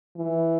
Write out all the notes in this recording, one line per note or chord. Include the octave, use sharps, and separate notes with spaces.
E3